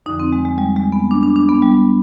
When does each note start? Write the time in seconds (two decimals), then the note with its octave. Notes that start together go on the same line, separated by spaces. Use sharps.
0.06 F2 D3 F3 D#4
0.20 C4
0.32 G#3
0.45 G#3
0.58 G3
0.76 G#3
0.92 B3
1.11 D4
1.23 D4
1.36 D4
1.49 B3
1.62 G3